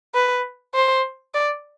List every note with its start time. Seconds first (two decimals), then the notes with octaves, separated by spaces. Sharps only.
0.15 B4
0.75 C5
1.34 D5